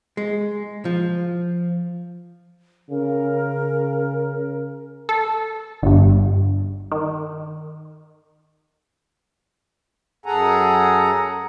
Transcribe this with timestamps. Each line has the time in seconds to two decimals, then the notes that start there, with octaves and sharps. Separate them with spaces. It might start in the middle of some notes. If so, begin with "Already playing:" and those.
0.17 G#3
0.85 F3
2.90 C#3 A#4
5.09 A4
5.82 G1 G2
6.92 D#3
10.26 F#2 G#4 A4 F#5 G#5 A#5